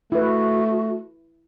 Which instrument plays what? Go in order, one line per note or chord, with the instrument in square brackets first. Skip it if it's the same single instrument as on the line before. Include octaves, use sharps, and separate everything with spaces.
[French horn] A3 [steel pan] E4 B4 [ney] F#4